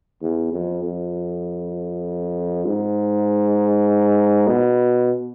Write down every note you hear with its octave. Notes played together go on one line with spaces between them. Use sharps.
E2
F2
F2
G#2
B2